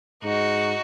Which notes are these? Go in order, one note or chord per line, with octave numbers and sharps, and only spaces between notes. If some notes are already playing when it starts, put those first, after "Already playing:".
G#2 D#4 F#4